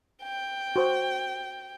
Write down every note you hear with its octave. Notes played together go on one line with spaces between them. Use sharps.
G5
F#4 C5